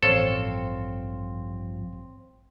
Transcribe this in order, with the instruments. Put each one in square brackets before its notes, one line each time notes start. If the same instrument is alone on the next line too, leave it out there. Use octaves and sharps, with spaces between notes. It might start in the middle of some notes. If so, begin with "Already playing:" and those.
[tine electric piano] A1 C#5 F5 [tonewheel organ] G2 F3 [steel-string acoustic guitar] C4 [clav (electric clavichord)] A4